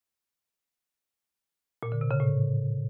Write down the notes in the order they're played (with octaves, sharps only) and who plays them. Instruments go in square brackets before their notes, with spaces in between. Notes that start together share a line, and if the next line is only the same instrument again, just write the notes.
[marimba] A#2
D3
C3
C#3
A2